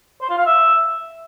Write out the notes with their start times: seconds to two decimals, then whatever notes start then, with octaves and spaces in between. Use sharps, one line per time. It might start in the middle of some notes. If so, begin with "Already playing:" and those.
0.21 C5
0.29 F4
0.38 F5
0.46 E5